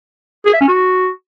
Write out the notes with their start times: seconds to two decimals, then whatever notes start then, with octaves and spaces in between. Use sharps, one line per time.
0.46 G#4
0.53 E5
0.61 C#4
0.68 F#4